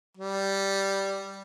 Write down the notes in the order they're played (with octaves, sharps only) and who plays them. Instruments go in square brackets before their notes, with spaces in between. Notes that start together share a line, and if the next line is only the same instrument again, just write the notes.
[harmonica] G3